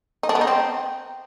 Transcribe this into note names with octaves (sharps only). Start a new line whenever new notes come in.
D#4
D4
B3
D#4
C4